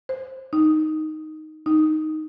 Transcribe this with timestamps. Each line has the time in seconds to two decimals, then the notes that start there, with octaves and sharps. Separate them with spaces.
0.09 C5
0.53 D#4
1.66 D#4